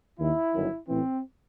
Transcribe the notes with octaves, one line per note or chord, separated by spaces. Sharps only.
D#2 D#3 E4
G1 F#2 D#3
A1 A2 E3 C4